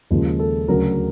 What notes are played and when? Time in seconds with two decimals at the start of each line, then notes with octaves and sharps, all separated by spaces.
0.10 D#2 C#3 F3 G#3
0.39 A4
0.68 D2 C#3 F#3 A3 A#4